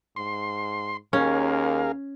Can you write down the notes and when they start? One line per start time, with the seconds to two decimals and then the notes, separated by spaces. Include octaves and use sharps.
0.16 G#2 C6
1.13 D#2 C#4 G#4 A#4 F5